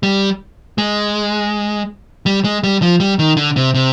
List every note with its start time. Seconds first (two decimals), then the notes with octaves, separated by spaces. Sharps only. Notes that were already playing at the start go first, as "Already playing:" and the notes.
0.03 G3
0.78 G#3
2.26 G3
2.44 G#3
2.64 G3
2.82 F3
3.00 G3
3.19 D#3
3.37 D3
3.56 C3
3.74 C3